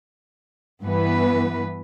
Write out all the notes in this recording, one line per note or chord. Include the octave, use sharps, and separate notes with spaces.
G2 E3 B3 B4